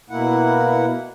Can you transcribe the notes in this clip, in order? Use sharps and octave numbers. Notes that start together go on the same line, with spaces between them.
B2 A#3 E4 F#5